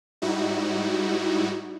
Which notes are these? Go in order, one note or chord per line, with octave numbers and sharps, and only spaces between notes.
G#2 G3 D#4 E4 F#4